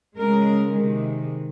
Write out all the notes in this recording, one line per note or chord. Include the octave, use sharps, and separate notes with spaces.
C#3 G#3 A#4
C3 D#3 G#3